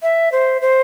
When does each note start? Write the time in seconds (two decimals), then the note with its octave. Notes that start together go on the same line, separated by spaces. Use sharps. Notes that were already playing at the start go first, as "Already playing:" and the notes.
0.03 E5
0.32 C5
0.62 C5